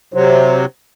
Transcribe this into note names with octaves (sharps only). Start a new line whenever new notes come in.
C3 F#3 C5